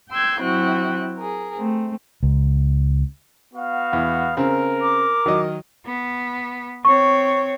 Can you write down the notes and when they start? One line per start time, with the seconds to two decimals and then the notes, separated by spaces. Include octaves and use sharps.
0.10 G5 C6 E6 G6 G#6
0.41 F#3 C4 E4 F#4 G5 F#6
1.17 G#4 A#4
1.57 A3 C4
2.23 C#2
3.54 B3 F#4 F5
3.93 E2
4.37 C#3 C4 A#4
4.82 D6
5.26 D#3 F#3 D#5
5.86 B3
6.85 C4 C#5 C#6